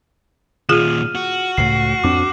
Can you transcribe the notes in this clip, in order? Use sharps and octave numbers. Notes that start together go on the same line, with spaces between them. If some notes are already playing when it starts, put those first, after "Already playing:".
D#2 A#2 F4 G#4 F6 D#7
F#4
C#2 A2 C7
F2 C4 D4 D6